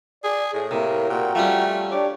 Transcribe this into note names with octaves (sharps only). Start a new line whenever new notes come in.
G#4 D5
A2 G#4
C3 A#3 E4 A#4
A#2 F#4 G5 A#5
F3 G3 A3 C#4
D4 G4 C#5 D5